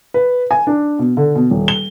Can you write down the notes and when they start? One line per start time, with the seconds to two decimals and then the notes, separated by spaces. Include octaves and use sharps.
0.14 B4
0.51 G#5
0.67 D4
0.99 B2
1.17 D3
1.35 B2
1.51 D#1
1.68 G7